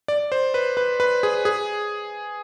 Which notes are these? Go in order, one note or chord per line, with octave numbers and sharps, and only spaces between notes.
D5
C5
B4
B4
B4
G#4
G#4